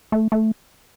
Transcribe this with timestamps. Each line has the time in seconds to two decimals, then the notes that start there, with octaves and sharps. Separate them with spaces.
0.12 A3
0.32 A3